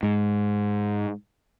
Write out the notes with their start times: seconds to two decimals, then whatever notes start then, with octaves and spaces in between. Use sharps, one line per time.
0.03 G#2